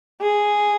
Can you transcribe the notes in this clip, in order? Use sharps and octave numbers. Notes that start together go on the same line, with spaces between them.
G#4